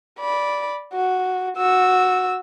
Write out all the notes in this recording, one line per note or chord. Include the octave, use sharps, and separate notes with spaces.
D5 B5
F#4
F#4 E6